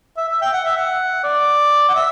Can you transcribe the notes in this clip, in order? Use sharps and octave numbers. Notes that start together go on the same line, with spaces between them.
E5
E5
G5
F#5
E5
F#5
D5
F#5
E5